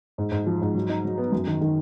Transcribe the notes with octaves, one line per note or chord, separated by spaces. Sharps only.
G#2
G#2
F3
G#2
F#3
D#4
F#3
B3
F#2
D#3
D#3